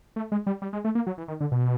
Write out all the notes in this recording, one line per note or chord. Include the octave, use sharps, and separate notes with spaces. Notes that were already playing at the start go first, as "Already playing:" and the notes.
A3
G#3
G3
G3
G#3
A3
A#3
F#3
E3
D#3
D3
B2